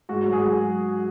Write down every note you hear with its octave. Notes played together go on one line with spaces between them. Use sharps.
G#2 F#4
F#3
G#4
F#3